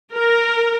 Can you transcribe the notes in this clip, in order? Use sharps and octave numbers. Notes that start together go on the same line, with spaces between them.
A#4